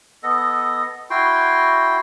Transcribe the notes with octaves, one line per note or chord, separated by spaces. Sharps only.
B3 A4 D#5
E4 F#4 G5 C6